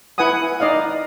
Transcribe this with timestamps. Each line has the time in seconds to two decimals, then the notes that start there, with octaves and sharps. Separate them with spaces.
0.18 E4 B4 F#5 G#5 D#6
0.60 D#4 D5 D#5 F5